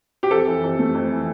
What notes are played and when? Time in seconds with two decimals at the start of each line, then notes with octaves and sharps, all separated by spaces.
0.23 G4
0.31 F2 A4
0.46 E3
0.63 F2
0.79 A3
0.95 F2
1.12 E3